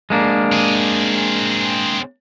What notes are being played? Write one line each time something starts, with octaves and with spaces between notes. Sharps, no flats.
G#3 A#3 D4
C4 G#4